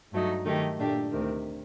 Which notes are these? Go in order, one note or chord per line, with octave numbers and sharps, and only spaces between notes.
G2 F#3 A3 D#4
D#3 F#3 A3 D#4 G4
A#2 A3 D4 G4
D2 C3 D#3